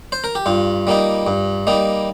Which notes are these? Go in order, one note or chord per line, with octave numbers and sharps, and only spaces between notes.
C5
A#4
G4
G2 F4
G3 A#3 D#4
G2
G3 A#3 D#4